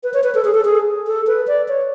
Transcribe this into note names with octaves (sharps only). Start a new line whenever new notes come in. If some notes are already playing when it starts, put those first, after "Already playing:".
B4
C#5
B4
A4
G#4
A4
G#4
A4
B4
D5
C#5